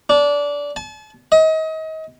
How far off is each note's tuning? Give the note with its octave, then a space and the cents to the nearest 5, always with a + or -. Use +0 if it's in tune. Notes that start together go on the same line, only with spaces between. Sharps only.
D4 -20
A5 -40
D#5 +30